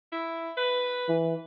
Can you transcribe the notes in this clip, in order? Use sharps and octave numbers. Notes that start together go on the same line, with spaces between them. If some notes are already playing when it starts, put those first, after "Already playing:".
E4
B4
E3